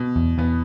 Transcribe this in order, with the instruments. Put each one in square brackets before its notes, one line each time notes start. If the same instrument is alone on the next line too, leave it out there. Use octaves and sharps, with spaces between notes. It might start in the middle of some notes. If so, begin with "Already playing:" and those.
Already playing: [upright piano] B2
[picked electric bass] E2
[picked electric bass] E2 [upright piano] B3